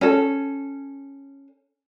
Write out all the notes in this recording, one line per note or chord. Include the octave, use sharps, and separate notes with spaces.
C#4 A4